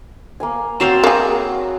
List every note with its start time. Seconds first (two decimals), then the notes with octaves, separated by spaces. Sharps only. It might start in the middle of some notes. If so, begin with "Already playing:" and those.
0.40 A#3 F5 G#5
0.80 F#3 C4 F#4 F5 A5
1.04 A#3 G#4